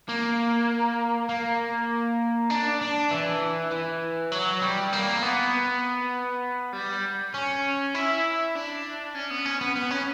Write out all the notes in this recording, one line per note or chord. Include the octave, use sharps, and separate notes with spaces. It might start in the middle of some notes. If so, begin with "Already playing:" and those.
A#3
A#3
D4
D4
E3
E3
F#3
G3
A#3
B3
G3
C#4
E4
D4
C#4
B3
C#4
B3
B3
C#4